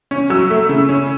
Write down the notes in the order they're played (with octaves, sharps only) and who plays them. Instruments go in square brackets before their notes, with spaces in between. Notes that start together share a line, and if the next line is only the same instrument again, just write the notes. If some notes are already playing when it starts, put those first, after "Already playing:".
[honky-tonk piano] C#4
F#3 E6
A3
C#3
C#4